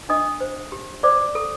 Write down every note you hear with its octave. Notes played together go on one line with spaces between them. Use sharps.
D4 D#5 D#6
C5
G4
C5 D5 D6
A4